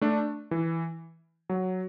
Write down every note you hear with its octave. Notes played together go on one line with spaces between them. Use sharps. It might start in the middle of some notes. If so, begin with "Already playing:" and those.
A3 D4
E3
F#3